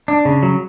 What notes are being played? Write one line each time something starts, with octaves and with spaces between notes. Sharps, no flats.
D4
C#3
F#3